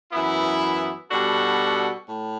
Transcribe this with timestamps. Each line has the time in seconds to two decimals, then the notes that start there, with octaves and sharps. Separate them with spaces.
0.12 F#2 E3 B3 E4
1.10 B2 G3 D4 F#4 A4
2.08 A2